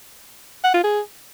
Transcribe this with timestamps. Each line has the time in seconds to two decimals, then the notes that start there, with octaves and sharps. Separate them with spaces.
0.64 F#5
0.74 F4
0.84 G#4